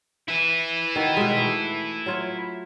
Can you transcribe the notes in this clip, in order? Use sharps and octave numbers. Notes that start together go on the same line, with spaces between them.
E4 B4
D#3 F#4
B2 G#3
A3
F#3 F4 C#5